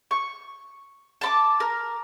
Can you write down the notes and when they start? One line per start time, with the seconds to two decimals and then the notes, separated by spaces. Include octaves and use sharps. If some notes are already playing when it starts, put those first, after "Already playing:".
0.11 C#6
1.21 A5 B5 D6
1.60 A#4